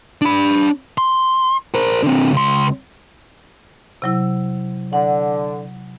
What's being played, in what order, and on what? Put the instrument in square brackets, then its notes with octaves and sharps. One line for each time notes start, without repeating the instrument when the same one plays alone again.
[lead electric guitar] D4 B5
C6
A#4 C5
D3 C4
C#2 C6
[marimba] C3 F#3 E4
[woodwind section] D3 [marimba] F#5